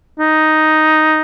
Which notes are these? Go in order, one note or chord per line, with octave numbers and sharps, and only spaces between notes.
D#4